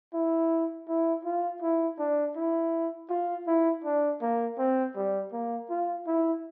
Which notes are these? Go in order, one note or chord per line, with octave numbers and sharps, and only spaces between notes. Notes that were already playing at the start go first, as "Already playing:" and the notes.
E4
E4
F4
E4
D4
E4
F4
E4
D4
A#3
C4
G3
A#3
F4
E4